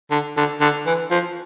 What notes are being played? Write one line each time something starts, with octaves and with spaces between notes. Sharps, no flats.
D3
D3
D3
E3
F3